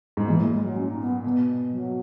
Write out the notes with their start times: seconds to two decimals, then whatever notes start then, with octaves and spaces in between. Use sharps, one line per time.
0.17 G#2
0.27 A#2 E3
0.39 G#3
0.52 G#3
0.64 F#3
0.76 C#4
0.87 D#4
1.00 B3
1.24 B2
1.72 F#3